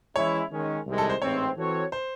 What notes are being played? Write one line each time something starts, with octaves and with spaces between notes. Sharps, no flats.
E3 G#3 C#4 E4 C#5
D#3 G#3 C#4
C2 C3 D#3 G#3
A4
C5
A1 G#2 E3 C4 C#5
E3 C4 F#4 A4 C#5
C5